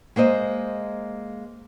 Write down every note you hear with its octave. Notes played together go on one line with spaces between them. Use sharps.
G#3 A#3 C5 D#5